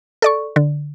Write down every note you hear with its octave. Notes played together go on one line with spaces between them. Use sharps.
A4 D5 C#6
D3